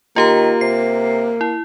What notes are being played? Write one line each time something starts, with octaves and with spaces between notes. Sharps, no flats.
D#3 A#3 F4 G4 A#5
C3 C7
E4